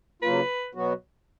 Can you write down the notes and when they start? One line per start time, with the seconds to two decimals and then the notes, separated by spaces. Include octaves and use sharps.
0.22 C#3 F#3 A#3 F4 B4
0.75 B2 F#3 B3 F#4